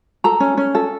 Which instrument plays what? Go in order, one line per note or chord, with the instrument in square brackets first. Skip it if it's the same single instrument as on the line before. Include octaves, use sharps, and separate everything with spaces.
[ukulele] A4 A#5
C#4
C#4
A4